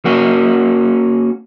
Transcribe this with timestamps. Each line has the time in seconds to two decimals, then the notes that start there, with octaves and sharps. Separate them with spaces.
0.05 A#3 C#4 F#4